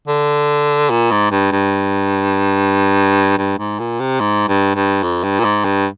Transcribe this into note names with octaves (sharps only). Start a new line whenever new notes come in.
D3
A#2
G#2
G2
G2
G2
G#2
A#2
C3
G#2
G2
G2
F2
G2
A#2
G#2
G2